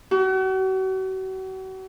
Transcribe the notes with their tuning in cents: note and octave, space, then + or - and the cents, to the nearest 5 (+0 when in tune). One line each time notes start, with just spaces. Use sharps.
F#4 +40